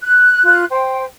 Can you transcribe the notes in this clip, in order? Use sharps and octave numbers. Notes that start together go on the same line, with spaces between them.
F#6
F4 F#6
C5 G5